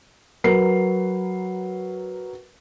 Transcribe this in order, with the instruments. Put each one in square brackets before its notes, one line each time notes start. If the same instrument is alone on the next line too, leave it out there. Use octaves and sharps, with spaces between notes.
[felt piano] F#3 A#4 B4 C7